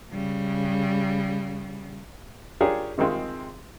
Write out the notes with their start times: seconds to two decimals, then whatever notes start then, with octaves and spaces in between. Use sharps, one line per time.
0.12 C#3 G3
2.61 D4 F4 G4 G#4 A#4 C#5
2.98 C3 D#3 G#3 C4 F4